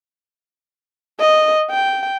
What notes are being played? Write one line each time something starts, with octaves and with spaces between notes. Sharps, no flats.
D#5
G5